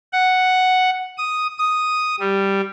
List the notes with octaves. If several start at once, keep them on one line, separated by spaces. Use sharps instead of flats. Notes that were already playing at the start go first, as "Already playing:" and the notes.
F#5
D#6
D#6
G3